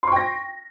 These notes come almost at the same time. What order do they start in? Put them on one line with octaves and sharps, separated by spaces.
C6 C#6 G5 A#6